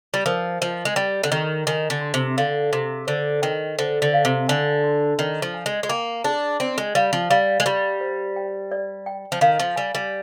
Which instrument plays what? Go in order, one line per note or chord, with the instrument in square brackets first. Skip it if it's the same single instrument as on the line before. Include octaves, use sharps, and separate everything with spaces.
[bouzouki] G3
[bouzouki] F3 [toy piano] A#4
[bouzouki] F3 [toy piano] D#5
[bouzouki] G#3
[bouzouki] G3 [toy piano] G5
[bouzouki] D3
[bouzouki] D#3 [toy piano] G4
[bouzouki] D#3 [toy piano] G#5
[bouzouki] D3
[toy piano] C6
[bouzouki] C3
[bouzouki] D3 [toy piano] F5
[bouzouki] C3 [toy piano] G#4
[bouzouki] D3 [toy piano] C5
[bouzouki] D#3 [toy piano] G5
[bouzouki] D3 [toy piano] C5
[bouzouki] D3
[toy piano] F5
[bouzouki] C3
[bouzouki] D3 [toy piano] G#5
[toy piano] C6
[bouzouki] D#3 [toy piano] D5
[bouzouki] F3
[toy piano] G#5
[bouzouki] G#3
G#3
[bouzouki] A#3 [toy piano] G5
[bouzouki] D4 [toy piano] G#4
[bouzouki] C4 [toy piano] D5
[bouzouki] G#3
[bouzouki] G3 [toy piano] F5
[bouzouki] F3
[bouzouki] G3 [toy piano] F5
[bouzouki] G#3
[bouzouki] G3 [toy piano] G4
[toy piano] C5
G5
D5
G5
[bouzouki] F3
[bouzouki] D#3 [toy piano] F5
[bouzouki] F3
[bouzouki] G3 [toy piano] G#5
[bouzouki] G3